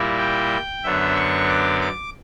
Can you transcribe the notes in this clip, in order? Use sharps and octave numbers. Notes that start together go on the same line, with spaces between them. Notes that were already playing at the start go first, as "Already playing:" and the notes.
Already playing: A#2 G3 A#3 E4
G5
F#2 D3 F#3 B3 D4 E5
C#6
D6
D6